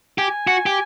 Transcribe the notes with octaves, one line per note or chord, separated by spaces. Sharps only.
G4 G#5
F#4
G4